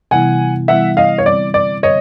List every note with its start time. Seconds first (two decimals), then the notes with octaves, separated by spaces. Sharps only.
0.11 C3 E3 G3 B3 E4 F#5 G#5
0.68 C3 E3 G3 B3 E4 E5 F#5
0.97 D#5 F5
1.18 C#5
1.25 D3 G3 C4 D5
1.54 D5
1.82 D3 G3 C4 C#5 D#5